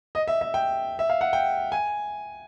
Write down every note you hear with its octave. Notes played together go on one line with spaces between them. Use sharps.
D#5
E5
E5
G5
E5
F5
F#5
G5
G#5